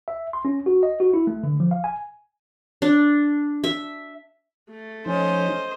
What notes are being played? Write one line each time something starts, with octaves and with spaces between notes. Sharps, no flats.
E5
C6
C#4
F#4
D#5
F#4
E4
A3
D3
F3
F5
G#5
D4
E5
A3
F3 C#4 D#4 C5 D#5